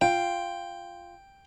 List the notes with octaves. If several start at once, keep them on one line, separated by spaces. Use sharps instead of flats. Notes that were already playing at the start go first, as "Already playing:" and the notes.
F4 G5